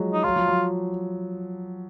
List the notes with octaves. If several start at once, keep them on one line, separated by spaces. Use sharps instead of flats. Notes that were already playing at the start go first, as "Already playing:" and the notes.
Already playing: F3 F#3 G#3
D#4
F#3 F4
F3
F#3